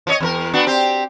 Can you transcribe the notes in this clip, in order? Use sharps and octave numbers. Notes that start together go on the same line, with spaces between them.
F3 C#5 D#5
E2 D#4 A#4
B3 D4 F#4
C4 G4